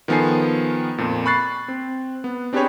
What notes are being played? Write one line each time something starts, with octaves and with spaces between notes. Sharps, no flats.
D#3 F3 B3 A4 G#5 C7
F2 A#2
B5 C#6 F#6 A6 C7
C4
B3
C4 D4 G4 G#4 B4 C#5